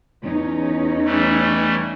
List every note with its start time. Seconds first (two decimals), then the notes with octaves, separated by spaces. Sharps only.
0.22 E2 C#4 D#4
1.05 E3 G3 A3